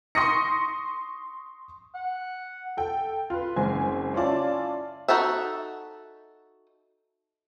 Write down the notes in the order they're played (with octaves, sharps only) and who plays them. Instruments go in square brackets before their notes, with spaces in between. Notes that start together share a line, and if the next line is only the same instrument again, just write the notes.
[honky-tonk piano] C6 C#6 D#6 A#6 C#7
[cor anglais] F#5
[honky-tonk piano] A4 G5
F4 B4
F#1 G#3 C4 G#5
C#4 E4 F4 D5 A5
[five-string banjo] D#4 F#4 A4 E5